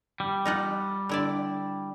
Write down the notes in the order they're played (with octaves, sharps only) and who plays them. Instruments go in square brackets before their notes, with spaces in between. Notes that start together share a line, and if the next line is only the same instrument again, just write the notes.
[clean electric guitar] G3
[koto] D#4 F4 F#5
D3 E4 D5